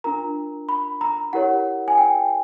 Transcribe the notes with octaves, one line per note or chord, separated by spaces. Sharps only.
D4 F4 A#4 A#5
B5
A#5
E4 G4 A#4 C#5 F#5
G#5
G5